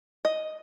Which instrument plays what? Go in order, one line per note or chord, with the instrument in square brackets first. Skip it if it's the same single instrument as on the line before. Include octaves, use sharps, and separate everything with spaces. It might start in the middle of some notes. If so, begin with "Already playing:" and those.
[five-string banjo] D#5